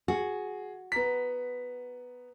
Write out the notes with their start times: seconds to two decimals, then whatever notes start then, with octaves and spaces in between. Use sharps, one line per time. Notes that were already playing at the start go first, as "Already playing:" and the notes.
0.08 F#4 G#4
0.92 B3 A#5 B6